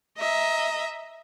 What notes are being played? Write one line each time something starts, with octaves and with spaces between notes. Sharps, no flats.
D#5 E5 A#5